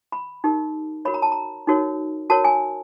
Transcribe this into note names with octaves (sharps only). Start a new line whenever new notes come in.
B5
D#4 G4 A#4
F#4 A#4 C#5 B5
A#5
A5
A#5
D#4 F#4 A#4 C#5
F#4 A#4 C#5 A5
G#5